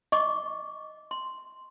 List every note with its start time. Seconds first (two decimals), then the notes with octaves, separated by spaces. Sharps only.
0.12 D#5 C#6 D6
1.11 C6